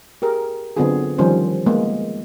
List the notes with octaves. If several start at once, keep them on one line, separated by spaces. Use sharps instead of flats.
G4 G#4 A#4
D3 F#3 B3 C4 F4 G#4
D#3 F3 G3 C#4 F4 C5
G#3 A#3 B3